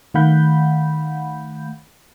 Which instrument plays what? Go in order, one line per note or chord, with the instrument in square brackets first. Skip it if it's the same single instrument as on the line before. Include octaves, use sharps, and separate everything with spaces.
[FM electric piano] D#3 A3 F5 F#5 B5 G6